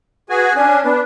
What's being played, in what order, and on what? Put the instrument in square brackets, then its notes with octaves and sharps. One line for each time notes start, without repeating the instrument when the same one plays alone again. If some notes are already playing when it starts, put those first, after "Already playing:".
[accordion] F#4 G#4 G#5 [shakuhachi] B4
[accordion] C#4 D4 [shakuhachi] G#5
[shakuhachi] B3 [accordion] D4